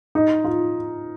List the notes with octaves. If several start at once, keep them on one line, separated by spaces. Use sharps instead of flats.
D#4
F4